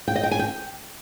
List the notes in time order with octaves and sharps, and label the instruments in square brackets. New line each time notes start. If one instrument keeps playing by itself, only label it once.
[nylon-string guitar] G5
D#5
G5
G#5
G5